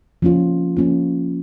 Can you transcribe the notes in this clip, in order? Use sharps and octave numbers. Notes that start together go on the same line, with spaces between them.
F3 A#3 C#4 F4
F3 A#3 C#4 F4